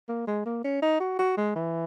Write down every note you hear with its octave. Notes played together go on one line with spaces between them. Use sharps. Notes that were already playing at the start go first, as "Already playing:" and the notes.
A#3
G#3
A#3
C#4
D#4
F#4
F#4
G#3
E3